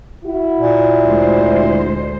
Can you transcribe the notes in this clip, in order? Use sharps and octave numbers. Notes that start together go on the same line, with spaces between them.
E4 F#4
A#2
D2 G#3 C5